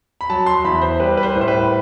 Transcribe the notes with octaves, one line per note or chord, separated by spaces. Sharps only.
B5
F#3 A5
C6
E2 B5
C5
G3 B4
B4
C5
A2
C5
B4